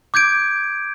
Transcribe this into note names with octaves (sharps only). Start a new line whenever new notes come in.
D6 G6 G#6 D7